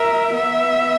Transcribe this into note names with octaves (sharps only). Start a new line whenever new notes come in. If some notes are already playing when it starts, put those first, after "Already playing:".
Already playing: A#4 E5
B3 E5